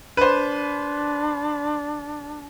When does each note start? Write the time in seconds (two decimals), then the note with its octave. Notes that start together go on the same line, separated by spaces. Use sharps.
0.17 D4 B4 C5